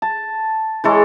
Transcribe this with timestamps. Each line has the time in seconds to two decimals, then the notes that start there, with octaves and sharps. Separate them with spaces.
0.02 A5
0.84 E3 G#3 A4 C#5